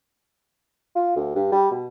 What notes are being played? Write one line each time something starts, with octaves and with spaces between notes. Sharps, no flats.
F4
D2
G2
G3
B2